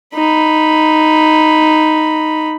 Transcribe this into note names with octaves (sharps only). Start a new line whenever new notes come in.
D#4 B5